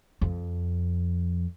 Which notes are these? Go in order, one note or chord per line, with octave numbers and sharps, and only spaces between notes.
F2